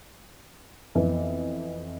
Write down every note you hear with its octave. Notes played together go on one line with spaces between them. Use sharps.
F2 E3 B3